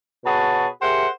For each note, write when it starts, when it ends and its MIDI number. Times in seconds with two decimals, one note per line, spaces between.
0.24 0.66 47
0.24 0.66 66
0.24 0.66 68
0.24 0.66 71
0.24 0.66 73
0.24 0.66 81
0.81 1.06 67
0.81 1.06 68
0.81 1.06 70
0.81 1.06 72
0.81 1.06 76
0.81 1.06 78